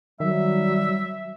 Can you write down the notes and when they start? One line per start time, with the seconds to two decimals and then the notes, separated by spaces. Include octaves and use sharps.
0.20 D#3 F#3 G3 E5